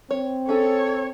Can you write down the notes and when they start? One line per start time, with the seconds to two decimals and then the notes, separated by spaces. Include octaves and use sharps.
0.11 C4 C#5
0.49 C#4 G#4 A4 C#5